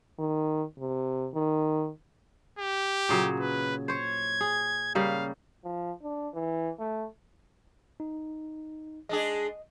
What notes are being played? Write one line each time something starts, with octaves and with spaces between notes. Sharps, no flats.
D#3
C3
D#3
G4
A#2 C#3 F#3
B4
C5 C#5 G#6
G#4
C#3 G3 A#3 F5
F3
D4
E3
A3
D#4
G#3 D4 G#4 D#5